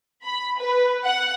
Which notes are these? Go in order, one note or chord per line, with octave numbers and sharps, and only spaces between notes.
B5
B4
F#5